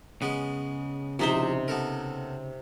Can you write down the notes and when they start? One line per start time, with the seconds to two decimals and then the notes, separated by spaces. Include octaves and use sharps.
0.22 C#3 G#3 B3
1.19 A#1 C3 D#4 E4 C5 E5
1.68 B3 A4 A#4